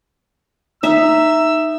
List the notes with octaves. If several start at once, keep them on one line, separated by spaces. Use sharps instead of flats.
D#4 E5 E6